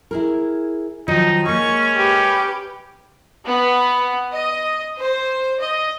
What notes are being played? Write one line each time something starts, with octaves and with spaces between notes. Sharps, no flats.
E4 G#4 A#4
D#3 F3 F#3 D#4
G#3 A#3 C#4 C#6
G4 B4
B3
D#5
C5
D#5